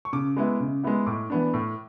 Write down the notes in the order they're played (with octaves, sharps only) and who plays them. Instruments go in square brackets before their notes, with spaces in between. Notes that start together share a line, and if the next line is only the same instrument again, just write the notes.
[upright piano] C#6
C#3 D6
G#3 B3 E4
C#3
G#3 B3 E4
A2 D6
E3 B3 D4
A2